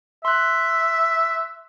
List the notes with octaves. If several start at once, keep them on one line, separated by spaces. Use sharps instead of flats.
E5 C6 F#6